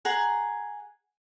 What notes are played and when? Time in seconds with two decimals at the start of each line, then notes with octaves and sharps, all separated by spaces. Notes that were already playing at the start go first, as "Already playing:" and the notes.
0.05 G#4 F#5 A#5